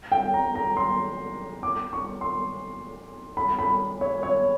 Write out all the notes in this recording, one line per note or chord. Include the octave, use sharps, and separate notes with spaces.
G5
A#5
A#5
C6
D6
C#6
C6
B5
B5
C#5
C#5